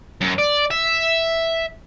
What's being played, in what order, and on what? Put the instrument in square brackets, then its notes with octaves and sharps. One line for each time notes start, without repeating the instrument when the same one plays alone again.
[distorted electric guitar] F#2
D5
E5